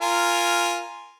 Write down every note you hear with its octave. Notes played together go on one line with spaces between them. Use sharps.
F4 A#4 G#5